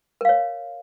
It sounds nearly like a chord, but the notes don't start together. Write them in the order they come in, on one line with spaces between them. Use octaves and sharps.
A#4 F5 C#5